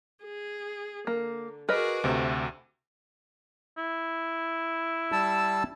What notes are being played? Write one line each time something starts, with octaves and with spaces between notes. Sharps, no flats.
G#4
D3 A#3
F#4 G#4 A#4 B4 D#5 D6
D2 C3 A3 F#4
E4
G3 A5 E6